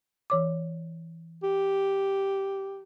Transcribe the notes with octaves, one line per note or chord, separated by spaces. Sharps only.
E3 C#5 D6
G4